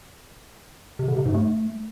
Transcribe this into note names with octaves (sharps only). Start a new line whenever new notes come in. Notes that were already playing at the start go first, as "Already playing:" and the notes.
C3
D3
C3
G#2
A3